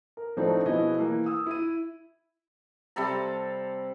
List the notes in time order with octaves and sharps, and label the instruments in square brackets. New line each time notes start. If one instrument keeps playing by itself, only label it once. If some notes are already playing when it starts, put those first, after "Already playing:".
[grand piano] A#4
A2 F3 A3 C4 D4 D#4
B2 F3 B3 E4 G#4 D#5
E3 A#3
D#6 E6
E4 D#7
[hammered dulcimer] C3 G3 A4 A#5